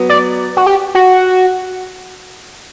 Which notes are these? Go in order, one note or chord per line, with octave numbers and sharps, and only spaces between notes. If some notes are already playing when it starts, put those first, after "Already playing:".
Already playing: F#3 B3
D5
F#4
G4
F#4